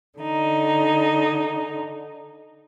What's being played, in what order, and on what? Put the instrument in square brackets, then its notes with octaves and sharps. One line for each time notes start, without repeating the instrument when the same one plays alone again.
[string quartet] D3 D#4